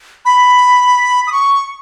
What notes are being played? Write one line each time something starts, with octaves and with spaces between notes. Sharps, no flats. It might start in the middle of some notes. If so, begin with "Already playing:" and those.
B5
D#6
C#6